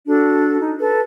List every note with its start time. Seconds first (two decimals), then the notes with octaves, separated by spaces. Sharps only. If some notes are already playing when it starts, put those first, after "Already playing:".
0.07 D4 F#4 A4
0.60 D#4
0.80 A4 B4